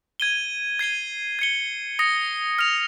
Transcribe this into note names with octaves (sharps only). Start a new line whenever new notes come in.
G#6 D#7 G7
G#6 C7 D#7 G7
G#6 C#7 G7
D#6 A#6 C#7
F6 A#6 F7